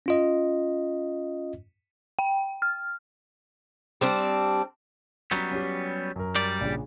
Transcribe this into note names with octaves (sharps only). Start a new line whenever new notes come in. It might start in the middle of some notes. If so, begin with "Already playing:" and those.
C#4 F4 D#5
G5
F6
G3 C4 D4
F#3 G3 B3 C#4 A#5
C#4 G4
F#2 A#4
G3 D5
A#1 C#3 D4